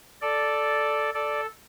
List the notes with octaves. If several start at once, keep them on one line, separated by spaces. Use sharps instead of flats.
A4 D5
A4 D5